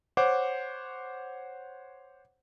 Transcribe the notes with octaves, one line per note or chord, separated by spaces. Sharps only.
C5 C#5 F#5 D6